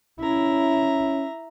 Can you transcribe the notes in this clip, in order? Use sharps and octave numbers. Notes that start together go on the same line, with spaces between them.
C#4 E4 E5 A#5